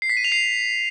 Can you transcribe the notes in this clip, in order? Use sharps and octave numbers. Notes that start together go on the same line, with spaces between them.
C7
B6
D#7
F7
C7